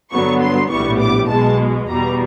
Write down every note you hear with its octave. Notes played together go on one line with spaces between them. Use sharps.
G2 D3 F#3 B3 C#6
C6
A#1 A2 E3 G3 B3 C#6
D6
B1 B2 G#3 A5
E2 B2 G3 A#5